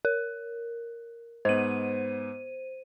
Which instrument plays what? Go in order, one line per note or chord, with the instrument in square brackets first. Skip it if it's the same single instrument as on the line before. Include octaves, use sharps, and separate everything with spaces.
[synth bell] A#4
[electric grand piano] G#2 B3 [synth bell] C5 D#7